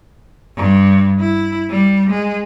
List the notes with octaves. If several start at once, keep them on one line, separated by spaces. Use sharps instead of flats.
G2
E4
G3
G#3